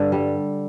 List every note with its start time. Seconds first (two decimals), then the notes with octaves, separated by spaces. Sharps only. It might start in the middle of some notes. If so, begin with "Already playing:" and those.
Already playing: G2 D3
0.12 G3